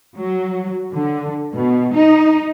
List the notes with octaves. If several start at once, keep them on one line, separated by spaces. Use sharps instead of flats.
F#3
D3
B2
D#4